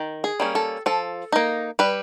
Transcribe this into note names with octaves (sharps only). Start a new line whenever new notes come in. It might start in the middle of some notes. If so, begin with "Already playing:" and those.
Already playing: D#3
G#4
G3 A#3 C#4
A4
F3 A4
A#3 D#4
G3 B4